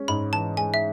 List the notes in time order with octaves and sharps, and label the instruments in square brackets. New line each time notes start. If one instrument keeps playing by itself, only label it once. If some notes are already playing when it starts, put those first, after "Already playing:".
Already playing: [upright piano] G#3 C#4
[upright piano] G#2 [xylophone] B5
[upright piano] E3 [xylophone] A5
[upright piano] G#3 [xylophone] G#5
[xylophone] E5